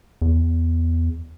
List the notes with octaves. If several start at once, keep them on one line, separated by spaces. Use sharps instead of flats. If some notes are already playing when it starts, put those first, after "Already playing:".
E2